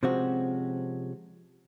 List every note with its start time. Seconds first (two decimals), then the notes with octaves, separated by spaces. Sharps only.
0.03 C3 F3 G#3 C4 C#4 F#4